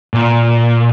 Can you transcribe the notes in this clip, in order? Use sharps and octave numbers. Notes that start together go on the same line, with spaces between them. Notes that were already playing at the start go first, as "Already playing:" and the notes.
A#2